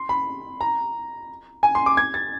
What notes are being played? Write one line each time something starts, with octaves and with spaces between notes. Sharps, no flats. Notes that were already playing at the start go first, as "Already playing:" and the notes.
Already playing: C6
B5
A#5
G#5
C6
D6
G#6
A6